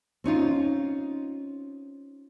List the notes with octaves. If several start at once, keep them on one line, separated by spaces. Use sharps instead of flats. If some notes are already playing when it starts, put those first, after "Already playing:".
C4 C#4 D#4 F4